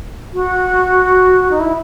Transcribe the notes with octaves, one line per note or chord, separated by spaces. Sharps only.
F#4
D#4
E4